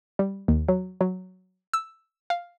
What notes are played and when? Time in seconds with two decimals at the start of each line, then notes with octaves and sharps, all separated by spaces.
0.19 G3
0.48 D#2
0.69 F#3
1.01 F#3
1.73 E6
2.30 F5